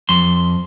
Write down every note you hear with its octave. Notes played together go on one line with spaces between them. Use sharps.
F2 C6